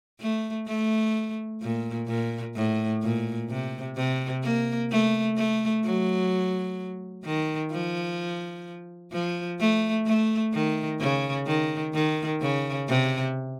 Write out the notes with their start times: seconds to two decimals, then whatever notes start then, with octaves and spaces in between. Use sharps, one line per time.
0.20 A3
0.67 A3
1.62 A#2
2.08 A#2
2.55 A2
3.03 A#2
3.49 C3
3.97 C3
4.43 A#3
4.91 A3
5.37 A3
5.84 F#3
7.25 D#3
7.72 F3
9.12 F3
9.60 A3
10.06 A3
10.53 D#3
11.00 C#3
11.47 D#3
11.94 D#3
12.41 C#3
12.88 C3